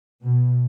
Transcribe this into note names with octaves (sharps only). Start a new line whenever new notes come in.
B2